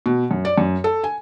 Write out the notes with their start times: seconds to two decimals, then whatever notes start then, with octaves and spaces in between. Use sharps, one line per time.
0.06 B2
0.31 F#2
0.45 D5
0.58 F#2
0.84 A4
1.04 G#5